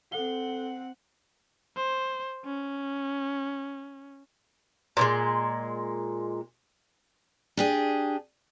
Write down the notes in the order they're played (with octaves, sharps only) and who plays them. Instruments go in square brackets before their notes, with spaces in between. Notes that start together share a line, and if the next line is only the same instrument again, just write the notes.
[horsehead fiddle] C4 F#5 [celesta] A4 G7
[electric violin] C5
C#4
[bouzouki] A#2 F3 G#3
[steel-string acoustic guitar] D4 G4 G#4